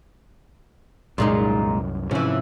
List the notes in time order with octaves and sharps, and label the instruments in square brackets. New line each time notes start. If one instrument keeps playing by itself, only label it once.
[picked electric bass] C2 F#2 [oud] A#2 G#3 D#4
[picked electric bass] G#2 C3 F3 [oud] E3 C#4